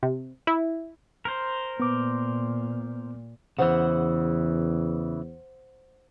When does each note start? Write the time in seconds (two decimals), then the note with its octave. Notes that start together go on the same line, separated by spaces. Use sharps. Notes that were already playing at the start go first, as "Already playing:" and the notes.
0.03 C3
0.47 E4
1.25 A#4 C5
1.80 A#2 B3 D6
3.59 E2 C#3 E3 C5 F#5